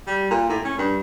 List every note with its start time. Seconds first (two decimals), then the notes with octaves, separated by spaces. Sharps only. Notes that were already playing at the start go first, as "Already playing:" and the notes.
0.07 G3
0.31 A#2
0.49 A2
0.65 C#4
0.78 G2